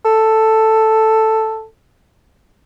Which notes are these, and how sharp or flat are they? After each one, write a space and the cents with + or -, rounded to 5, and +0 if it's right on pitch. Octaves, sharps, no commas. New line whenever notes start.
A4 +5